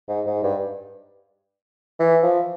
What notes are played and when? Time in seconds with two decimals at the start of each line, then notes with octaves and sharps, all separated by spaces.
0.08 G#2
0.26 G#2
0.43 G2
2.00 E3
2.23 F3